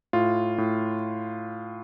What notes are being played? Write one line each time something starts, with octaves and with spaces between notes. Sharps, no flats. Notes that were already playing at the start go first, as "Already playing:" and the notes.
A2 F4
A2